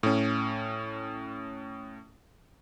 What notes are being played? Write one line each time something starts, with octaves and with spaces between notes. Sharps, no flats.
A2 C#4